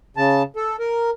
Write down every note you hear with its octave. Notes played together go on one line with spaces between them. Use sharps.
C#3 A5
A4
A#4